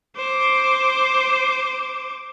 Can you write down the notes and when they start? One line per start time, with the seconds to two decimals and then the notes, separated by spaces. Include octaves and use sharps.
0.17 C5 D6